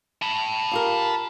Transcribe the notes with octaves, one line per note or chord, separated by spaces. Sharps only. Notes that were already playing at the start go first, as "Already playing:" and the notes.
A5 B5
F4 G4 A#4